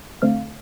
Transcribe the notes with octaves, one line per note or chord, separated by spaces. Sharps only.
D3 A3 C4 F5